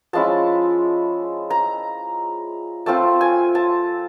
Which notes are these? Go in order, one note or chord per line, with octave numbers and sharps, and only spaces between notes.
F3 G#3 C#4 E4 A5
A#5
A3 C4 F4 A5
G#5
A5